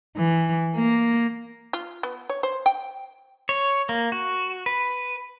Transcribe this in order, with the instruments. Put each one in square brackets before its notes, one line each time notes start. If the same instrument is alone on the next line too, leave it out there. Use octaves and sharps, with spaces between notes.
[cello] E3
A#3
[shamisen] F4
B3
C#5
C5
G5
[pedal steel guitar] C#5
A#3
F#4
B4